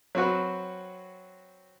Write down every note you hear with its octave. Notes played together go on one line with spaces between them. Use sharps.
F#3 C4 F#4 B4